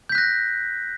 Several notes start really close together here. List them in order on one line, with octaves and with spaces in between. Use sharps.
G6 B6 F#6 A#6